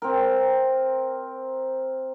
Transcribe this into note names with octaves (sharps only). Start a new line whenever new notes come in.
C4 A#4